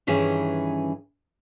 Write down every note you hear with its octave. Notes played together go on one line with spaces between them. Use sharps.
G2 D#3 E3 C#4 G#4